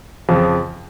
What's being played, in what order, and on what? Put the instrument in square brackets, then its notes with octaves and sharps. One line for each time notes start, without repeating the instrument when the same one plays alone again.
[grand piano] F2 C#3 F3